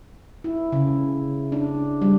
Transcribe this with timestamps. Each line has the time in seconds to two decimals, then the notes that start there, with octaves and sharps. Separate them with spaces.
0.44 E4
0.72 C#3
1.52 D4
2.02 G3